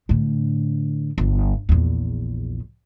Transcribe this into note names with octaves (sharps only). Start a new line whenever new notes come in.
A2 D3
G1
A#1 E2